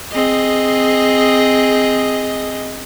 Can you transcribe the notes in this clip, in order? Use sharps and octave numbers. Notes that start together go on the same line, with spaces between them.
C4 G#4 D#5